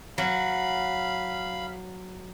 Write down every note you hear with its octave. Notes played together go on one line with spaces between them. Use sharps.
F#3 F5 B5